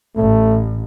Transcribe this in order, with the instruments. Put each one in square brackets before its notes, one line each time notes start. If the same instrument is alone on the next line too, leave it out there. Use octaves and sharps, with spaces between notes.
[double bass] A1 [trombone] A3